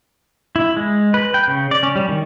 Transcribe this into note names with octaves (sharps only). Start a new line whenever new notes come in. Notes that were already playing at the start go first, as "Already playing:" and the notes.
E4
G#3
B4
G5
C#3
D5
C#4
G3
D#3